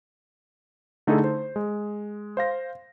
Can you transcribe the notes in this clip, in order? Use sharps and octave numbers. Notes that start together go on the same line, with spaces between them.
D3 A3 D#4 E4 G#4 A4
C5
G#3
C5 F5 A#6